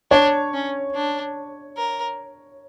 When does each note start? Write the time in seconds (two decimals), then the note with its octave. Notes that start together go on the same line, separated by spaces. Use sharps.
0.11 D4 C#5
0.54 C#4
0.95 D4
1.77 A#4